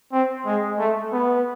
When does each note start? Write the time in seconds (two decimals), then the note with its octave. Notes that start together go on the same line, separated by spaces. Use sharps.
0.13 C4
0.46 G#3
0.79 A3
1.12 B3